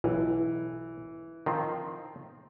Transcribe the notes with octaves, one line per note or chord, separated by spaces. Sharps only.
B1 E3
D#3 F3 C4